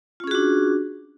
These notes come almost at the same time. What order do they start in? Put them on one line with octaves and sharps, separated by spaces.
F4 C#4 G#4 F#4 D4